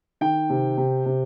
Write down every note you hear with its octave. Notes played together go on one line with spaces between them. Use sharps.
D#3 G5
C3
C3
C3